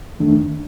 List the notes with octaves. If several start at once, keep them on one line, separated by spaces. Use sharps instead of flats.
F2 D#3 A3 D4